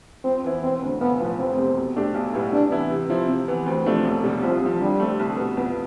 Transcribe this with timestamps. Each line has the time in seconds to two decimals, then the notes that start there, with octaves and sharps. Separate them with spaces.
0.24 F2 C4
0.44 E3 B3 E4
0.63 E1 C4
0.82 D2 D3
1.01 B1 B3
1.20 A2 F3 B3
1.38 F1 C4
1.58 E2 C3
1.77 B2
1.96 A3 D4 G4
2.14 B1
2.33 A2 G3 B3 E4
2.52 C3 D4
2.71 E3 B3 E4
2.91 C3
3.10 F3 C4 E4
3.29 C3
3.48 E3 B3
3.66 D2 C4
3.86 C3 F3 A3 D4
4.05 E1
4.23 E2 C3 G3
4.42 C2 F3
4.61 C3 F3
4.80 D3 G3
5.00 A3 C4
5.19 C2
5.37 B2 B3
5.56 F2 B3